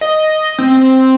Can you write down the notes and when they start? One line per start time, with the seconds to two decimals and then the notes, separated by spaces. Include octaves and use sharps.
0.01 D#5
0.58 C4